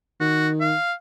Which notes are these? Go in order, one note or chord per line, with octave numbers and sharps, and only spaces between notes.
D#3 F#4
F5